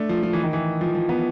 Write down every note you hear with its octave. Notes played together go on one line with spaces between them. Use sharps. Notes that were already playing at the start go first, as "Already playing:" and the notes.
Already playing: A3 D4
F3
F3
E3
D#3
E3
F3
F3
B3